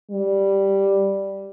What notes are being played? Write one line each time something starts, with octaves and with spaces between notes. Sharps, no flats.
G3